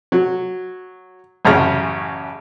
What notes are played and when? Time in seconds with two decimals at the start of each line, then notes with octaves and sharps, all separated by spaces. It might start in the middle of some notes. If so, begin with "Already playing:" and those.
0.12 F#3
1.45 A1 F#2 C#3 F6